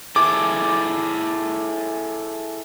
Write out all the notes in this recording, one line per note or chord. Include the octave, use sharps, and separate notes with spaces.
E4 G#4 A4 D6